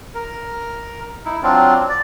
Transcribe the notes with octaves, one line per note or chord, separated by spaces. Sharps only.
A#4
D#4 E4
F#3 C4 D4 F4
D5